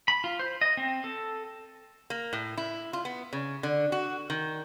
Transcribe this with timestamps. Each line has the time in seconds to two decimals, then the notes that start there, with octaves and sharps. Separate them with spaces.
0.08 B5
0.24 F4
0.39 C5
0.61 D#5
0.77 C4
1.04 A4
2.10 A#3
2.33 A2
2.57 E4
2.93 F4
3.05 B3
3.33 C#3
3.63 D3
3.92 F#4
4.30 D#3